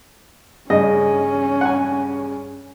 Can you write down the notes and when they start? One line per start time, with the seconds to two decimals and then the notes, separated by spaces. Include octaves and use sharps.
0.70 G2 C#3 C#4 D#5
1.61 F#5 G#5